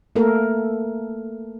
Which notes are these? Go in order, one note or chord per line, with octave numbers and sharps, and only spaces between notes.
A3 A#3 A4 A#4